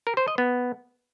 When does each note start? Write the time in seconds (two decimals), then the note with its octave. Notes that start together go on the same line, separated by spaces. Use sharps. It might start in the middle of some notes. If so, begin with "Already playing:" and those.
0.07 A#4
0.17 C5
0.28 D#5
0.38 B3